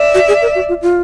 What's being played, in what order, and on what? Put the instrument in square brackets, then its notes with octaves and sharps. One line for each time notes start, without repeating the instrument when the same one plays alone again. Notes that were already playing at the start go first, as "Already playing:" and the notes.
Already playing: [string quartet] D5 E5
[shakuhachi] F#4
G#4
A#4
F#4
F4
F4